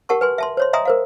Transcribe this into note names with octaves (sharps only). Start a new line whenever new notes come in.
G4 A#4 F#5 A5 C#6
B4 G#5 C6
E5 A5 C6
C5 C#5 C6
D#5 E5 G#5 A#5 C6 D#6
A#4 C5 F5